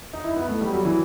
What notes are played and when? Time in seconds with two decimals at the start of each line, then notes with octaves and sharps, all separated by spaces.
0.13 D#4
0.24 E4
0.36 B3
0.48 A3
0.61 G3
0.72 F#3
0.85 E3